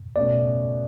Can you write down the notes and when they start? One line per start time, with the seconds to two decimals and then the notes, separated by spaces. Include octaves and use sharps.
0.16 B2 A3 C#4 D5